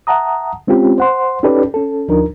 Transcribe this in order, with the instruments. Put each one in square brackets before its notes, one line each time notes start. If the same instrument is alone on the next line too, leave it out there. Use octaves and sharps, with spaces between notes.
[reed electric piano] E5 F#5 A5 A#5 D#6
G#3 C4 C#4 F4 G4
C5 F#5 C6
C#4 D#4 G4 A4 B4 D5
C#4 A4
D2 F3 D4 D#4 A#4